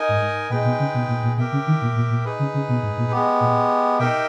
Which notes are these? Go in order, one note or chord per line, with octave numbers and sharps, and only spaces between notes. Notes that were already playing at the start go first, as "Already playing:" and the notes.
Already playing: D#4 A#4 D#5 G#5
G#2
A#2 G#3 D#4 G#4 B4 G5
B2
C#3
B2
A#2
A#2
B2 G4 A#4 E5 G5
C#3
D#3
A#2
A#2
A#2
D#4 G#4 B4
C#3
C#3
B2
G#2
A#2
G#3 B3 G4
A#2
B2 D#4 G4 A#4 E5 G5